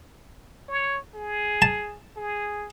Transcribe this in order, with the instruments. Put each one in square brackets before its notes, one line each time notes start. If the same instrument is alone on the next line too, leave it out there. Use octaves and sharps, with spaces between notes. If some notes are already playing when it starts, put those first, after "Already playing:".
[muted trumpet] C#5
G#4
[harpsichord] A5
[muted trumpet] G#4